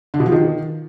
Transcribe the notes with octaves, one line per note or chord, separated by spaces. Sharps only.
D3
B2
F3
D#3